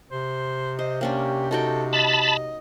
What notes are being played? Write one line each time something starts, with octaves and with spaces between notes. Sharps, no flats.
C3 C5
C5 D#5
A#3 C#4 D4 G4
D#4 F#4 A4 G5
D#5 A5 B5